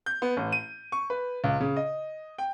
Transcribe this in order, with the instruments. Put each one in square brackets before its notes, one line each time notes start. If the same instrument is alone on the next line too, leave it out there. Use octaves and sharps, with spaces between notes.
[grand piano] G6
B3
A1
D#7
C#6
B4
C#2
C#3
D#5
G5